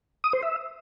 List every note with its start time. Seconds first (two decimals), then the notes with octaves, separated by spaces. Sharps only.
0.24 D#6
0.33 C5
0.43 E5